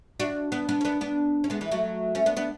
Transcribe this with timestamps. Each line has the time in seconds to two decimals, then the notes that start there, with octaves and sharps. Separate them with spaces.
0.20 D4 F#4
0.52 B3 D4
0.69 B3 D4
0.81 C#4
0.85 B3 D4
1.01 B3 D4
1.44 C#4
1.50 G#3 B3
1.61 E3 G#3
1.71 F#3 A3
2.15 A3 C#4
2.26 B3 D4
2.37 B3 D4